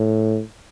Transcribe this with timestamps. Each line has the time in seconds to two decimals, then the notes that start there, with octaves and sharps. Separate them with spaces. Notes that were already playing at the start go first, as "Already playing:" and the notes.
Already playing: A2